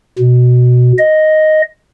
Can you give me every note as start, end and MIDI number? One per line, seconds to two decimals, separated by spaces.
0.19 0.92 47
0.99 1.62 75